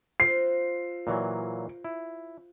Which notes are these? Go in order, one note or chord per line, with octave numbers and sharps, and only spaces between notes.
F4 C5 C7
A#2 E3 F#3
E4